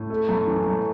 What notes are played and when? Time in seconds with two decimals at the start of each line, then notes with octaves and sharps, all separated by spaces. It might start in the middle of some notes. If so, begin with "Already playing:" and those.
Already playing: A2
0.10 A3
0.29 F#2
0.47 E3
0.66 F#2